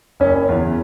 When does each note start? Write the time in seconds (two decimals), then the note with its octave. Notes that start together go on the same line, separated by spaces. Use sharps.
0.20 F#1 C#4
0.49 E2 E3